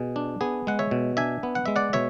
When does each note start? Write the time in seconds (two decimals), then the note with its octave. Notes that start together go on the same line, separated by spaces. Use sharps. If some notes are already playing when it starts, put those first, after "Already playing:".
Already playing: B2 G#4
0.16 D4
0.41 B3 G#4
0.67 G#3 F#5
0.79 C#5 E5
0.91 B2
1.17 D4 E5 G#5
1.43 B3
1.55 F#5
1.66 G#3 E5
1.76 D5 F#5
1.93 B2 C#5 E5